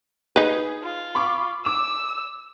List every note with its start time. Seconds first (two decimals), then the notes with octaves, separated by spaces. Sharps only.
0.36 D#4 G#4 B4
0.83 F4
1.15 B5 C#6 D6
1.65 D6 E6 E7